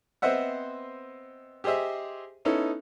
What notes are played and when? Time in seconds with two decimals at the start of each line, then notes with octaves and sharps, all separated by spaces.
0.22 B3 C4 C5 D#5 E5 F#5
1.64 G4 G#4 C5 D#5 E5
2.45 B3 C#4 D#4 E4 A4